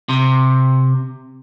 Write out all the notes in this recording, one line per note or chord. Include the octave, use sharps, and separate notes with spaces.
C3